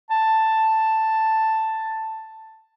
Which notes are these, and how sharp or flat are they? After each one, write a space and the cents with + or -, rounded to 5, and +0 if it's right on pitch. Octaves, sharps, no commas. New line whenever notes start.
A5 +5